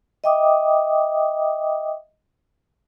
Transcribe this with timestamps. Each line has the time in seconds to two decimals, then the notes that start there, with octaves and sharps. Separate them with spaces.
0.24 D#5 E5 G5 D6 D#6